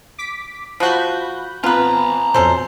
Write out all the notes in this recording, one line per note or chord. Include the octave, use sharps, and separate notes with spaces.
D6 B6
F3 F#4 B5 F#6 G6
B3 C4 F4 B4 A5 A#5
F2 B2 C#4 A4 C5